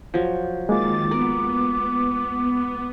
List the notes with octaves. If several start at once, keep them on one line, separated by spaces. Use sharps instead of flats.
F3 F#3
D#3 G#3 A#3 F4 D6 A6
B3 A#4 D5